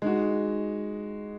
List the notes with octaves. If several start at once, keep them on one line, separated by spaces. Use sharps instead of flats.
G#3 D#4 F#4